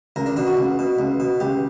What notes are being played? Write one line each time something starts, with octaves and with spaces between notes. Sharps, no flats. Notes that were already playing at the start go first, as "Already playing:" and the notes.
C#2 A#4
D4
B2 D4
F#4
C#2
B2
C#2
B2
C#2 G4